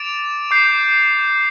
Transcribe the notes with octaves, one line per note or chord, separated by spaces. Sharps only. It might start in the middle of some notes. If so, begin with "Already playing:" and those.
Already playing: D6 A6 D7 F7
D6 G6 C7